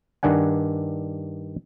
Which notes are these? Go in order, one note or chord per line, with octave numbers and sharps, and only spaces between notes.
G2 D#3 D4 F#5 G#5